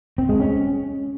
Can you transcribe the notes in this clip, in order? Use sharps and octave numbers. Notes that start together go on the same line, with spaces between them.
C4
G#3
C#4